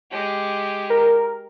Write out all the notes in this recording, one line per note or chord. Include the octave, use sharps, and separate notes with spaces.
G#3 G4
A#4